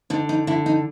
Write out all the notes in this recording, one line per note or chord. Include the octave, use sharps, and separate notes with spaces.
D3 D#4
D#4
D3 E4
D#4